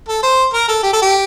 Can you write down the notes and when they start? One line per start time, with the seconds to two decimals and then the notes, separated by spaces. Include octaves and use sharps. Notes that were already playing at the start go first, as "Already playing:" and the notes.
0.08 A4
0.23 C5
0.53 A#4
0.68 A4
0.83 G4
0.93 A4
1.02 G4